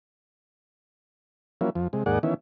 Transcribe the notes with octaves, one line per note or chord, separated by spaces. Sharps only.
F3 F#3 A#3 C#4 E4
F2 F3
C3 G#3
D#2 G#2 A#3 G#4 D5 F#5
D#3 E3 B3 C#4 E4